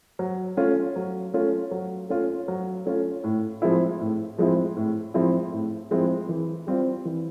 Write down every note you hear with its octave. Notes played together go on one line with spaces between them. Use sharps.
F#3
A3 C#4 F4
F#3
A3 C#4 F4
F#3
A3 C#4 F4
F#3
A3 C#4 F4
A2
F3 G#3 C4 E4
A2
F3 G#3 C4 E4
A2
F3 G#3 C4 E4
A2
F3 G#3 C4 E4
E3
G3 C4 F4
E3